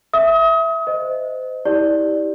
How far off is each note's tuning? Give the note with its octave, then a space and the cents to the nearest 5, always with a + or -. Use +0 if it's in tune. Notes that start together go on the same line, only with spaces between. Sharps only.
E5 +0 D#6 +35
C5 -25 D#5 +0
E4 -40 G4 +0 D5 +0